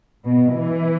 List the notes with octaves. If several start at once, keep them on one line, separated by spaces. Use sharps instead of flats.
B2
E3